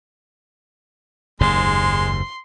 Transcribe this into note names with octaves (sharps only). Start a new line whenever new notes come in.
F#1 D#2 G#2 G#3 C6